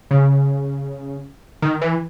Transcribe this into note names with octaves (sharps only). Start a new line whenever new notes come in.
C#3
D#3
E3